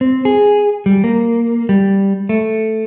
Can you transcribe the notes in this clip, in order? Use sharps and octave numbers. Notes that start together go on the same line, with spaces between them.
C4
G#4
G3
A#3
G3
A3